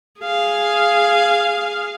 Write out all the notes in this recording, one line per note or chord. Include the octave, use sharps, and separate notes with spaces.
G#4 F5